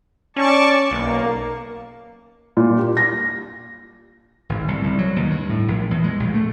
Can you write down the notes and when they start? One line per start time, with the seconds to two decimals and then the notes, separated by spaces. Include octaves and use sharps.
0.36 C#4 D5 A5 C#6
0.91 B1 A#3
2.57 A#2
2.78 G4
2.97 A#6
4.49 G#1
4.68 C2
4.84 C2
4.99 F#3
5.16 D#2
5.30 G2
5.50 A2
5.68 A#1
5.91 E2
6.04 G#3
6.20 A#1
6.34 A3